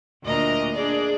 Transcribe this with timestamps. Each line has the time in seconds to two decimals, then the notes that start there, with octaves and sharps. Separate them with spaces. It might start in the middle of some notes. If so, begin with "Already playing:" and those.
0.23 D2 A#2 D4 A#4 D#5 A#5
0.74 D4 G#4 D5